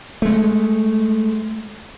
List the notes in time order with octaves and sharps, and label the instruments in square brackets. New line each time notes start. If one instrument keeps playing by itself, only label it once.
[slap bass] G#3 A3